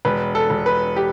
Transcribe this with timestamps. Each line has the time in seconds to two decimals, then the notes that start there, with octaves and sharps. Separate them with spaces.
0.05 E1 B4
0.35 A4
0.50 E1
0.66 B4
0.96 G4